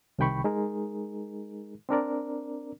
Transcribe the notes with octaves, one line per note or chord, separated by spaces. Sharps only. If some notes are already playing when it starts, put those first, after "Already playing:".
C2 C3 D#3 G5 B5 C#6
G#3 D#4 G#4 A#4
C4 D4 A#4 D5